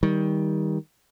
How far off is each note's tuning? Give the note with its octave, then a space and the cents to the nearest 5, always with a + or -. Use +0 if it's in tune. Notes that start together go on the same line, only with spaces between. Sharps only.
D#3 +20 G3 +10